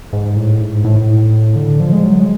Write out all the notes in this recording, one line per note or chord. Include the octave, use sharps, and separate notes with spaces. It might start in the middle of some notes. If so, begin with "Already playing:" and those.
G#2
A2
G#2
A2
D3
F3
G#3
F#3
G#3